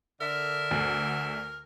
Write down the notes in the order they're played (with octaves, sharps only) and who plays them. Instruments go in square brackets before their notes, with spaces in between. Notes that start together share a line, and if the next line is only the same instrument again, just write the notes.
[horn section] D3 [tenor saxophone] A#4 [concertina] E5
[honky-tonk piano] D2